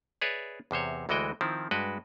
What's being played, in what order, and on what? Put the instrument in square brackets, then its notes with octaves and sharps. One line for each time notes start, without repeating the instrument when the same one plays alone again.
[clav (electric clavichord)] G#4 B4 C#5 D5 E5
E2 C3 C5 C#5
D2 E3 G#3 F#4 D#5 G5
D#3 F3 C4 E4
G2 G#3 F#4 B4 G5